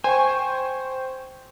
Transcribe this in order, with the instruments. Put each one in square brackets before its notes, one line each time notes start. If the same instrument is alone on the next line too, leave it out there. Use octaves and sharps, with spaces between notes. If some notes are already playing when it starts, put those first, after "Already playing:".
[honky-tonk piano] C5 G5 C#6 [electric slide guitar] G#5